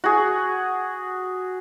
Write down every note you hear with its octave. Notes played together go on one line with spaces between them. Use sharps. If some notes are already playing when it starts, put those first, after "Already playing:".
F#4 G#4